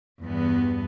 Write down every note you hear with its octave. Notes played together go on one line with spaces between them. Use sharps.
E2 G2 B3